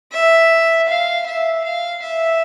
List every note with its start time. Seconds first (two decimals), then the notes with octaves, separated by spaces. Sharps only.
0.12 E5
0.88 F5
1.27 E5
1.64 F5
2.02 E5